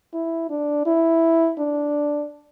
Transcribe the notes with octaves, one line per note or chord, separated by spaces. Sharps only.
E4
D4
E4
D4